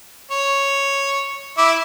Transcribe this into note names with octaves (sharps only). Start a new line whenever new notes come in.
C#5
E4 D6